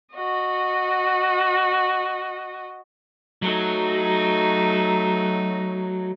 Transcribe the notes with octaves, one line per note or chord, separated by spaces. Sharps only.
F#4 D#5
F#3 A3 D#4